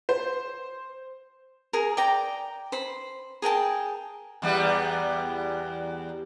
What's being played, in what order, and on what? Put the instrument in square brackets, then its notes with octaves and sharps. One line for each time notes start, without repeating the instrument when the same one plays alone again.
[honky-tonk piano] C5
[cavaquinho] G#4 A#4
D5 G5 A#5
C5 B5
G#4 A#4 G5 A5
[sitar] E2 G3 B3